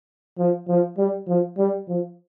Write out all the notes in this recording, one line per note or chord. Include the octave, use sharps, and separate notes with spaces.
F3
F3
G3
F3
G3
F3